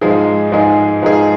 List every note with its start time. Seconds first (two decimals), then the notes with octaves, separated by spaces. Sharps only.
0.01 G#2 F3 G#3 D#4 G#4
0.52 G#2 F3 G#3 D#4 G#4
1.02 G#2 F3 G#3 D#4 G#4